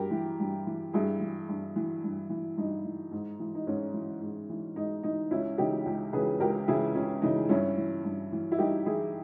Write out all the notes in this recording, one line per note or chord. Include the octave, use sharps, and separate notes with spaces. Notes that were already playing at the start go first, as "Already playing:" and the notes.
Already playing: G2 G4 A#4
E3
G2
E3
G2 E4 G#4
E3
G2
E3
G2
E3
G2 D#4
E3
G#2
E3
D#4
G#2 C#4
E3
G#2
E3
G#2 D#4
E3 D#4
C#2 C#4 E4
C#3 E3 D#4 G4
C#2
C#3 E3 G#4 B4
C#2 G4 A#4
C#3 E3 E4 G#4
C#2 C#4
C#3 E3 D#4
G2 C#4 E4
E3
G2
E3
E4
G2 D#4 G4
E3 E4 G#4